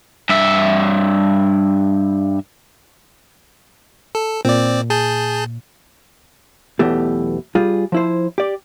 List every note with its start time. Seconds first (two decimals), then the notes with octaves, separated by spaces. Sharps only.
0.29 G2 E5
4.15 A4
4.45 A#2 C4 D5
4.90 G#4 A5 G6
6.79 B1 E2 B2 E3 A3 G4
7.55 G3 F4 G#4
7.92 F3 E4 C5
8.38 G4 D5